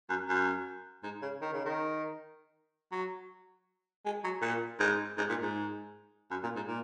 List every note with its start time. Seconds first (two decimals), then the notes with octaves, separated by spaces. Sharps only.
0.09 F#2
0.29 F#2
1.03 G#2
1.22 C#3
1.41 D#3
1.53 C#3
1.65 D#3
2.92 F#3
4.05 G#3
4.24 F#3
4.42 A#2
4.80 G#2
5.18 G#2
5.29 A#2
5.42 G#2
6.31 F#2
6.43 A#2
6.56 G#2
6.68 A#2